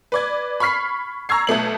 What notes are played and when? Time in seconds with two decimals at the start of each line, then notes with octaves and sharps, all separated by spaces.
0.12 B4 D5 G#6
0.60 B5 C#6 F6 B6 C7
1.29 A#5 C#6 E6 G#6 C7
1.47 B1 B2 A3 F#7